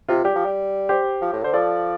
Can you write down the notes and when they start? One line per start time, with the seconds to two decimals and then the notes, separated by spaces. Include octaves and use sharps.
0.08 C3 F4
0.24 G3 G4
0.36 F3
0.46 G3
0.89 G4 C5
1.22 F3
1.33 A2
1.43 D3 C5
1.53 F3 A4 D5